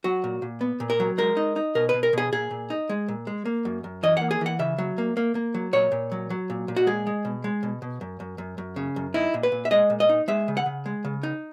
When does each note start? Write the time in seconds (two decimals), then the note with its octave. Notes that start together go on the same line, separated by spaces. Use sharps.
0.04 F#3 F#4
0.24 A#2
0.42 A#2
0.61 B3
0.80 A#2
0.90 A#4
1.00 F#3
1.18 G#3 A#4
1.37 D#4
1.56 D#4
1.75 B2 A#4
1.89 B2 B4
2.03 A#4
2.13 B2 G#4
2.32 A#2 G#4
2.51 A#2
2.70 D#4
2.89 G#3
3.08 A#2
3.27 G#3
3.45 A#3
3.65 F#2
3.84 F#2
4.03 E3 D#5
4.17 A#3 F#5
4.31 G#4
4.41 E3 F#5
4.59 C#3 E5
4.78 F#3
4.98 A#3
5.17 A#3
5.35 A#3
5.54 F#3
5.73 A#2 C#5
5.92 A#2
6.12 F#3
6.30 F#3
6.50 A#2
6.68 A#2
6.76 F#4
6.87 G#3 G#4
7.07 G#3
7.25 B2
7.44 G#3
7.63 B2
7.82 B2
8.01 F#2
8.20 F#2
8.38 F#2
8.58 F#2
8.76 C#3
8.96 F#2
9.14 D#4 E4
9.34 A#2
9.43 B4
9.52 A#2
9.65 E5
9.71 G#3 D#5
9.90 A#2
10.00 D#5
10.09 D#4
10.28 G#3 E5
10.48 C#3
10.57 F#5
10.66 C#3
10.86 G#3
11.05 C#3
11.23 D#4